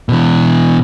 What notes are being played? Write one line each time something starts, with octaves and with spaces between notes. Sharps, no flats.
B2 E3